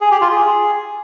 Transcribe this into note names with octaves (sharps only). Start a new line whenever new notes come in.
G#4
G4
F4
G#4